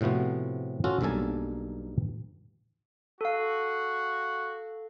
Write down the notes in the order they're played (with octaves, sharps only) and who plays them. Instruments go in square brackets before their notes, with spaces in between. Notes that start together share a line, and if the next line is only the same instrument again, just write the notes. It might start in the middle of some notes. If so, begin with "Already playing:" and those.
[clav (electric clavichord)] A2 C3 F3 B3 F#4
C#4 F4 F#4 A4
B1 G2 A#3 A4 G#5 A5
[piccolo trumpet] F#4 [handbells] A4 F5